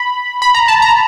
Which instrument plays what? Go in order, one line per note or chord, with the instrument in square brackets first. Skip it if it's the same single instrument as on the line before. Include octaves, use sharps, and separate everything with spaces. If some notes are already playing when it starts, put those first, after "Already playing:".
Already playing: [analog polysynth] B5
B5
A#5
A5
A#5